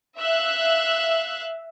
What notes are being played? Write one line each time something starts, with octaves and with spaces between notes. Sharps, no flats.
E5 F5 F#6